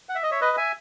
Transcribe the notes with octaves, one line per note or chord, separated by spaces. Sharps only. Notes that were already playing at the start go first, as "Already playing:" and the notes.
F#5
E5
D#5
C#5 E5
B4 D#5
E5 G#5